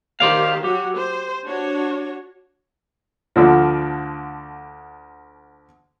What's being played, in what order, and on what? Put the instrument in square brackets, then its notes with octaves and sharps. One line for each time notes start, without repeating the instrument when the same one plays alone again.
[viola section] D#3 G4 [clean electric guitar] C5 D5 F5
[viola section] F#3 F#4 [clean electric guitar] G4
[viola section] C5
D4 F#4 C#5
[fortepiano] D2 D3 F3